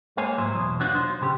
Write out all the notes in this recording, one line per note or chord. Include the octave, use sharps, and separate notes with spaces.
G#3 A#3 C5 C#5 G#5
G#2 F#3 E4 C5
E2 B2
F#3 B3 D4 D#4 F4 F#4
F#3 C5
B1 C#3 G4